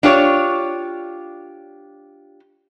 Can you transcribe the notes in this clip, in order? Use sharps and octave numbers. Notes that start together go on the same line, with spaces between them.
D4 F4 G4 C#5